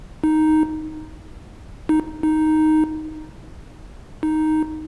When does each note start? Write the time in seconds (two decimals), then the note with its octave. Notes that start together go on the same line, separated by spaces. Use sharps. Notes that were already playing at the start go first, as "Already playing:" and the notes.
0.24 D#4
1.89 D#4
2.23 D#4
4.23 D#4